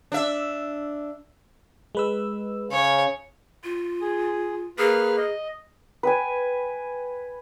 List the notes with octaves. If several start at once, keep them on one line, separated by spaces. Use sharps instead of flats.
D4 E5
G#3 B4 E6
C#3 C#5
F4
G#4
A#3 G#4 B4 F6
D#5
B4 G5 G#5